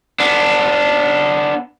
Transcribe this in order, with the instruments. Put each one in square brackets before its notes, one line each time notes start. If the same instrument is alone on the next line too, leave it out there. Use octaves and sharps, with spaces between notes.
[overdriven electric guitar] B3 D4